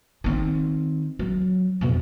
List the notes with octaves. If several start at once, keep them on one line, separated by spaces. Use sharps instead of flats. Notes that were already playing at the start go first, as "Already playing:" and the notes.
D#3 C4
F#3
F2 B2